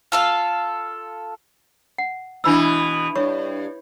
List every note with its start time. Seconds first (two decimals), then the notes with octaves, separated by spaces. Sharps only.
0.12 F4 A4 F5
1.98 F#5
2.44 B2 E3 D4 B5 E6
3.16 G2 C#5 C#6